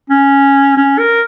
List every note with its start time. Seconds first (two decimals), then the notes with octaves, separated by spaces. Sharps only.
0.10 C#4
0.77 C#4
0.99 A#4